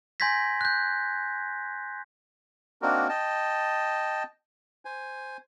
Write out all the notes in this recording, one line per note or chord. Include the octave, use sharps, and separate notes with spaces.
G#5 C6 G6 G#6 A#6 B6
F#6 G6
A#3 C4 D4 D#4 F#4 A#4
D#5 G5 A5
C5 G#5